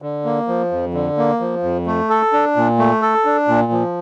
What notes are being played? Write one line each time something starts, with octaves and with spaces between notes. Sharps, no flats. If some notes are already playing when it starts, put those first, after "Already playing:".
D3
A#3
F3
F2
D3
A#3
F3
F2
A3
A4
D4
A#2
A3
A4
D4
A#2
F3